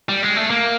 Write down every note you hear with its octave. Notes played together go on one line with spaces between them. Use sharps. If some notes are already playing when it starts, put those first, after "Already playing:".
G3
G#3
A3
A#3